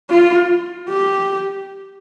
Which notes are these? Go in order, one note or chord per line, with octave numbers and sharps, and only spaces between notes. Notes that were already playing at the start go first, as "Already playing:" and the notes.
F4
G4